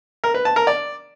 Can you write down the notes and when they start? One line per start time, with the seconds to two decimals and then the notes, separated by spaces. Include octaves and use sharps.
0.24 A#4
0.34 B4
0.45 A5
0.56 A#4
0.67 D5